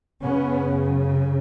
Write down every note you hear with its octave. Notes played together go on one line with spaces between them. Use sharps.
F#2 C#3 B3 C#4